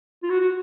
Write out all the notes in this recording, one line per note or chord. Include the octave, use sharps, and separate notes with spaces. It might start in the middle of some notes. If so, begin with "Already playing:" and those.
F4
F#4
F#4